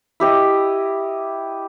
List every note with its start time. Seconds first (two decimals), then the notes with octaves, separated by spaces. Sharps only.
0.20 E4 G4 D#5